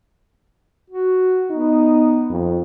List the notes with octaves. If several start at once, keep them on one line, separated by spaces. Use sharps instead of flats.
F#4
B3 D#4
F2